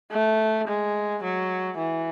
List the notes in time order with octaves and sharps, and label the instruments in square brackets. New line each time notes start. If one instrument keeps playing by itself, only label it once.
[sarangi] A3
G#3
F#3
E3